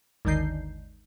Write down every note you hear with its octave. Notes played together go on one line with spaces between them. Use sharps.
G#1 D#2 D3 D#3 G6 C7